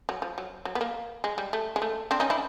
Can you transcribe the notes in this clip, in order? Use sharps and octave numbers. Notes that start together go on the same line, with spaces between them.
F#3
F3
F#3
F#3
B3
A#3
G#3
G3
A3
G#3
A3
C4 D4
C#4 D#4
D4 E4